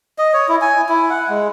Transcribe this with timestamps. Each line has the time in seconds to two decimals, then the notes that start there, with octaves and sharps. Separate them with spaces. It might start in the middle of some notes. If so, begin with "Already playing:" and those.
0.18 D#5
0.33 C#5
0.49 E4
0.61 G#5
0.89 E4
1.10 F#5
1.29 G#3